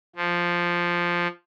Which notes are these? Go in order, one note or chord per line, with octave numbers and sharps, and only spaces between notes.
F3